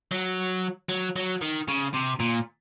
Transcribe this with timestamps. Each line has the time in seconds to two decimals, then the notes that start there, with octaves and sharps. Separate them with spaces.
0.12 F#3
0.89 F#3
1.16 F#3
1.42 D#3
1.69 C#3
1.94 C3
2.20 A#2